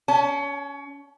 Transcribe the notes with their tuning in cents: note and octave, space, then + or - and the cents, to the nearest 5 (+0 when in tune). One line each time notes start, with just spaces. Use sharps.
C#4 +20 A5 -30